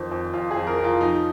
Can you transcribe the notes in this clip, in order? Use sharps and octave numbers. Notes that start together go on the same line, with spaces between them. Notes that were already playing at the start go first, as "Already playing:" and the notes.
Already playing: F2 D#3 C5
F2
F2 F4
G#4
F2
A#4
F2
F4
F3 D#4